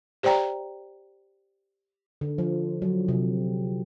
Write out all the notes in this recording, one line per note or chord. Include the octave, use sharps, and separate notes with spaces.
G4 C5 D5 G5 A#5
D3
F3
F#3
C3